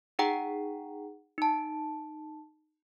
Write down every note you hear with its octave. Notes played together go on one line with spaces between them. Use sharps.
D#4 G#4 F#5 G5 A#5
D#4 A5